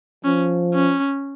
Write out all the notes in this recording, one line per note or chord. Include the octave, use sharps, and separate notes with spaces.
F3 C#4
C#4